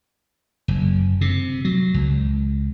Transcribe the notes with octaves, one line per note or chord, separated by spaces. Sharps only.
F#1
C3
F#3
C#2